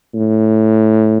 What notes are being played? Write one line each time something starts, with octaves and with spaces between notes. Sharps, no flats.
A2